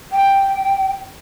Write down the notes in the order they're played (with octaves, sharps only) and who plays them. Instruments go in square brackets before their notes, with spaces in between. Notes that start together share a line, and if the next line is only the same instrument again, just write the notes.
[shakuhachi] G5